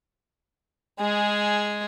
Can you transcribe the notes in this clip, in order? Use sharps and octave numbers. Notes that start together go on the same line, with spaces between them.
G#3 G#4